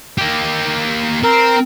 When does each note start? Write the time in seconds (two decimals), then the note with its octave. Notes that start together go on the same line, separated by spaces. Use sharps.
0.18 A#3 G4
1.24 C4 A#4